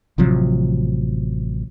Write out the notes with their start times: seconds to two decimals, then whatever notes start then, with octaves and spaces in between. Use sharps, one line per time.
0.18 A1 C3 F3 F#3